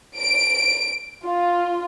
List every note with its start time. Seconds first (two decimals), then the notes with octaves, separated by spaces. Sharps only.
0.18 D7
1.25 F4